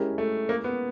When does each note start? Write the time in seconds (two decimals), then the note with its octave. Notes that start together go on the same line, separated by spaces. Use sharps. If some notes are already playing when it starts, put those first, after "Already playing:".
Already playing: G#3 C#4 E4 G4 A#4
0.18 A3
0.49 A#3
0.64 B3